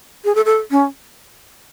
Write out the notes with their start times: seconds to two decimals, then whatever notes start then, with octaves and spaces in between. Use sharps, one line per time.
0.25 G#4
0.35 A4
0.45 A4
0.71 C#4